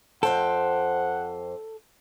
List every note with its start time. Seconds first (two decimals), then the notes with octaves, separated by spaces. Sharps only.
0.23 F2 A4 C5 F#5 G5